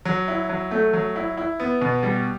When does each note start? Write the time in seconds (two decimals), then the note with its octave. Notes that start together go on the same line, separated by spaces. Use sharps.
0.05 F#3
0.28 E4
0.49 F#3
0.71 A3
0.93 F#3
1.16 E4
1.37 E4
1.60 B3
1.81 B2
2.03 G3